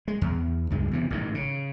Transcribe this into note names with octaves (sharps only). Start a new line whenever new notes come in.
G#3
E2
C#2 G2 G#3
E2 C3 E3
A1 G#2 D#3
C#3